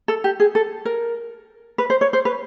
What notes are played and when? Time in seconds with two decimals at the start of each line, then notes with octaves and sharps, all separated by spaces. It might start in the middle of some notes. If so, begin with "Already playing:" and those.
0.08 A4
0.24 G4
0.40 G#4
0.55 A4
0.85 A#4
1.78 B4
1.90 C5
2.01 C#5
2.13 C5
2.25 B4